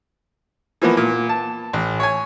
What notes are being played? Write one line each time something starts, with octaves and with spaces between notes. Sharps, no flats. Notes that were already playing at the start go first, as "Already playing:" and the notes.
E3 F3 A#3 B3
A#2
A5
A1
C#5 G#5